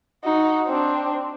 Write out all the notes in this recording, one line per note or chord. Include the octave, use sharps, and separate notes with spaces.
D#4 F#4
C4 D4